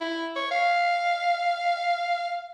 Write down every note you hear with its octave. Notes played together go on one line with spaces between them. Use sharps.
E4
C#5
F5